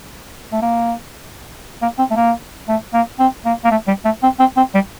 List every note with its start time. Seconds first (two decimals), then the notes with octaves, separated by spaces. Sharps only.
0.52 A3
0.62 A#3
1.82 A#3
1.98 C4
2.11 A3
2.16 A#3
2.68 A3
2.93 A#3
3.19 C4
3.45 A#3
3.64 A#3
3.71 A3
3.87 G3
4.05 A3
4.23 C4
4.40 C4
4.57 C4
4.74 G3